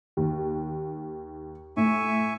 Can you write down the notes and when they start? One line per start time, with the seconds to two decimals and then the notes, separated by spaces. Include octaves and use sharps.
0.17 D#2
1.77 A2 E5 G#5 C#6